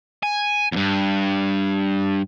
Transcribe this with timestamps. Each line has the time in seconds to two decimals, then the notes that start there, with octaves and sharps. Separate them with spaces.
0.23 G#5
0.72 E2 G2